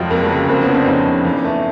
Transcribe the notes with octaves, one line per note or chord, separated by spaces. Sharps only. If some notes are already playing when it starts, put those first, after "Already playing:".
Already playing: F1 F3 F#3 G#3
F2 G#3 A#3
F#3 G#3
C#3
F1 A#3 C4
B3 C#4
F3
C4 D4
F2 C#4 D#4
C#3
E2
A3